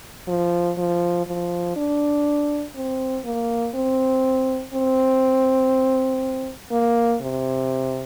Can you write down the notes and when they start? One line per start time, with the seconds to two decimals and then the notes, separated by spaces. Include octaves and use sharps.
0.27 F3
0.77 F3
1.27 F3
1.76 D4
2.75 C4
3.25 A#3
3.75 C4
4.74 C4
6.72 A#3
7.21 C3